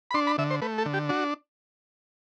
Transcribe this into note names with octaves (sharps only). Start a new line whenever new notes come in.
B5
D4 C6
B5
D3 E5
C5
A3 B4
A4
D3
G4
D4 F#4